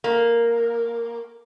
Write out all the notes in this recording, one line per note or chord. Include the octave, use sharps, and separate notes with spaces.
A#3